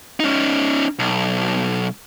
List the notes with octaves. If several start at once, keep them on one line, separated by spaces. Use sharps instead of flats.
C#4 D#4
B1